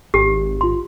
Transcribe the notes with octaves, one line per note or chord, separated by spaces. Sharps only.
G#1 G4
F4 C6